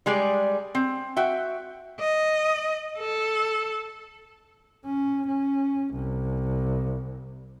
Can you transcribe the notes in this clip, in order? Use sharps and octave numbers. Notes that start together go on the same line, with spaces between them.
G3 G#3 G#4 D5
C4
F#4 E5 G5
D#5
A4
C#4
C#4
C2